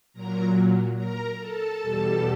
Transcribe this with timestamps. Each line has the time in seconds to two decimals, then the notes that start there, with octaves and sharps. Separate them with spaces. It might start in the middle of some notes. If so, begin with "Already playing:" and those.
0.13 A#2 F#3 A#4 A#5
0.97 A#4 A#5
1.39 A4 A5
1.81 E2 B2 G3